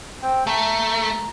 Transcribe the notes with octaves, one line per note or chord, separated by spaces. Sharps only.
C4 G5
A3 A#5